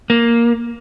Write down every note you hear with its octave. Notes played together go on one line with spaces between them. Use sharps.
A#3